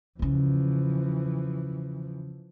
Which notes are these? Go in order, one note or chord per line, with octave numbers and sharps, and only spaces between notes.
E2 C#3 E3 F3